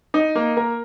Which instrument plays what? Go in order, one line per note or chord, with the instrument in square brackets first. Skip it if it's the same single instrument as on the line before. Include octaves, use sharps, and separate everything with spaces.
[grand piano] D#4
A#3
A#4